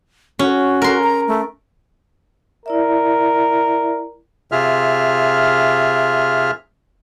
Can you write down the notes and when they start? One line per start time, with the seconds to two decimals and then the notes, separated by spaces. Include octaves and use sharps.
0.39 C#4 F#4
0.82 A#4 C6
1.04 A#5
1.28 A3
2.66 E4 A#4 D5 E5
4.52 C3 F4 G#4 E5 F6